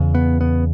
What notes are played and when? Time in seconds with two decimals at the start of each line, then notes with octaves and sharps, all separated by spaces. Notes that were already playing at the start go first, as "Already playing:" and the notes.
Already playing: E2 C#3
0.15 B3
0.41 B3